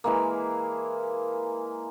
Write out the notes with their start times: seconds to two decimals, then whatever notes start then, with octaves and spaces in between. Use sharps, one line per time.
0.04 E3 G#3 A#3